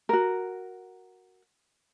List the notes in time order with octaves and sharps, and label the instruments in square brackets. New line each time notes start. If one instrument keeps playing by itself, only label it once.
[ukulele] F#4 A#4